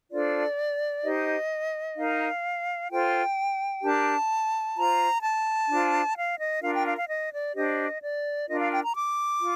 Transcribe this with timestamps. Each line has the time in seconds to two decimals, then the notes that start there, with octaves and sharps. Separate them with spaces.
0.10 D4 F4 A4 C5 D5
1.03 D#4 G4 C5 D#5
1.96 D#4 A#4 F5
2.90 F4 A4 C5 G5
3.82 D4 G4 A#4 A5
4.76 F4 C5 A#5
5.22 A5
5.68 D4 F4 C5
6.15 F5
6.38 D#5
6.61 D4 F4 A#4 F5
6.74 G5
6.85 F5
6.97 F5
7.08 D#5
7.31 D5
7.54 D4 G4 C5 D#5
8.01 D5
8.47 D4 F4 A#4 D#5
8.59 F5
8.71 G5
8.82 A#5
8.94 D6
9.41 F4